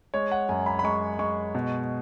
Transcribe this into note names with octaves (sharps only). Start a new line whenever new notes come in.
G#3 C#5
F#5
F#2 G#5
B5
B5
G#3 C#6
G#3 C#6
B2